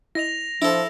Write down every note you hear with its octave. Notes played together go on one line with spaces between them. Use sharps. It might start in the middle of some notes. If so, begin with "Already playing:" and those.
E4 D#5 A#6 F7
F3 D4 E4 A4